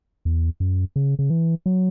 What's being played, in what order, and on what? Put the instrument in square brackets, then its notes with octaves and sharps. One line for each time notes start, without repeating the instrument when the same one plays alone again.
[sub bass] E2
F#2
C#3
C#3
E3
F#3